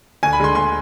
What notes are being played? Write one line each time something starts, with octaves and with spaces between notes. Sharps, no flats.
D2 G#5
B5
D3 G#3 C6
D2 C6